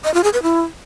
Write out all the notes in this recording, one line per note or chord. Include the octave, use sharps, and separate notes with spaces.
D#5
F4
G#4
B4
E4